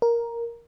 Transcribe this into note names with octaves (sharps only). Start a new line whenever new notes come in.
A#4